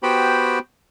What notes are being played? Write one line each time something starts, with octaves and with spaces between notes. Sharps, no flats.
B3 F#4 G4 C5 G5 B5